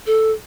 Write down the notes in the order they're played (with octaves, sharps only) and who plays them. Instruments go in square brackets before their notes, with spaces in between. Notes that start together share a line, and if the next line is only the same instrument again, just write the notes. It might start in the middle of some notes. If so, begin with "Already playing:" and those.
[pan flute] A4